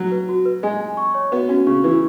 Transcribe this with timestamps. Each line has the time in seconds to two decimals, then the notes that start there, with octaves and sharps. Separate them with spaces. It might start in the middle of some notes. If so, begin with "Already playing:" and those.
Already playing: F#3
0.12 B4
0.29 F#4
0.45 B4
0.63 G#3 G#5
0.81 G#5
0.97 C#6
1.14 C#5
1.32 B3 F#4
1.49 C#4 F#4
1.67 C#3 C#6
1.84 E3 B4